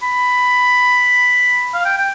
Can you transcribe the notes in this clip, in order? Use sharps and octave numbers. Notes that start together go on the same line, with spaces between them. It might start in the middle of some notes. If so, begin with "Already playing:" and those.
B5
F5
G5
G5